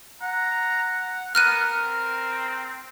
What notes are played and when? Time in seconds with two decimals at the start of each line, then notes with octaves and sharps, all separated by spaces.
0.21 F#5 A#5
1.35 B3 A#4 F6 F#6 D#7
1.71 C4